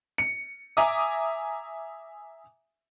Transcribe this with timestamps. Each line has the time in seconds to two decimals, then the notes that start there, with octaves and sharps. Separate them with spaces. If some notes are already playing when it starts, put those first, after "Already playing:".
0.18 C#7
0.77 E5 G#5 A#5 D6 D#6